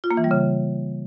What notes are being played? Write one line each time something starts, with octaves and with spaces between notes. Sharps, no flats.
F4
A#3
E3
G3
C#3